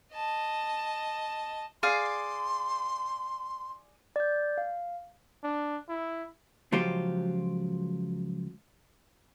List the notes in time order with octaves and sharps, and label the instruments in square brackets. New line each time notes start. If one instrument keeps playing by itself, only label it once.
[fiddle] D#5 A5
[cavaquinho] G#4 D5 F5 [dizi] C6
[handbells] D5 G6
F5
[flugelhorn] D4
E4
[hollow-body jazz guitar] C#2 F3 F#3 F4 G4 C5